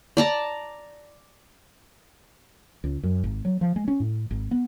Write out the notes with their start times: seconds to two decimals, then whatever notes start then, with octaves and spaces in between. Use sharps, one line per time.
0.17 D5 A5 A#5
2.84 C#2
3.03 F#2
3.24 G#1
3.45 F#3
3.61 F3
3.76 G#3
3.88 C#4
4.00 A2
4.31 G#1
4.51 B3